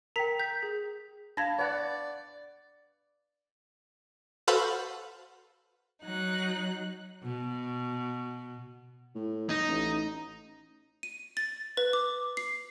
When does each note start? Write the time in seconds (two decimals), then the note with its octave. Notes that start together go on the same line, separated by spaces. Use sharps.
0.16 A#4 G5 A#5 B6
0.40 G6 B6
0.63 G#4
1.37 D4 F5 A5 B5 G#6 A#6
1.59 B4 D5 F#5
4.48 F#4 A4 B4 C5 F5 F#5
6.04 F#3 D#4 F#6
7.24 B2
9.15 A2
9.49 D#4
9.68 A1
11.03 D#7
11.37 A6
11.77 B4
11.93 D6
12.37 C7